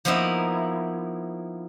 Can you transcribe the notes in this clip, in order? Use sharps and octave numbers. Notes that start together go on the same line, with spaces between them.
F3 A#3 B3 D#4 E4